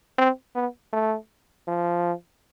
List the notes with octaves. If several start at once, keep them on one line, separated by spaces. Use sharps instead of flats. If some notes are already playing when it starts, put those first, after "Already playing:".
C4
B3
A3
F3